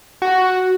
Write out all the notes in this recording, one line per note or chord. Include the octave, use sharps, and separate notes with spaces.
F#4